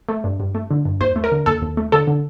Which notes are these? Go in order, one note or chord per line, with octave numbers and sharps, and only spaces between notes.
A3
G2
G2
A3
D3
G2
D#2 C5
A3
A#4
D3
D#2 A4
D#2
A3
D3 A4
D3